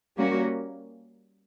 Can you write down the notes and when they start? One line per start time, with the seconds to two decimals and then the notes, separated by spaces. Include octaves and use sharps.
0.17 G3 A#3 C#4 F#4